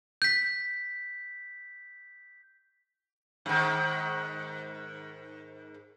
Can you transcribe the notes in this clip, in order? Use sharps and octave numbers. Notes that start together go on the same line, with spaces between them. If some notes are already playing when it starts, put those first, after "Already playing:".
G6 B6
G#2 D#3